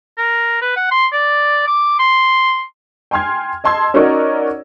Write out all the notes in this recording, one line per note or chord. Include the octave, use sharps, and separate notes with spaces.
A#4
B4
F#5
C6
D5
D6
C6
G5 G#5 C6 F6 G#6
D#5 A5 C6 E6 G#6
C#4 D#4 F#4 A#4 C#5 D5